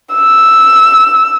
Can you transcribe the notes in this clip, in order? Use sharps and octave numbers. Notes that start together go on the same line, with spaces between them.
E6